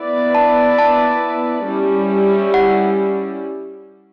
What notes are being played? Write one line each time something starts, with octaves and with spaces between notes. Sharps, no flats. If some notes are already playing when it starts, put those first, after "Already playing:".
Already playing: B3 E4 B4 D5
A5
A5
G3 C#4 E4
F#5